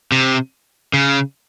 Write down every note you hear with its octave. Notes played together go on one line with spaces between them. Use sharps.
C3
C#3